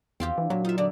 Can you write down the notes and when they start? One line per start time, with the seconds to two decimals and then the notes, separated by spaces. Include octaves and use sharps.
0.20 E2 C4 F4 G4
0.38 E3 D4
0.50 A#2 F#3
0.65 D#4 F4 E5
0.78 D3 D5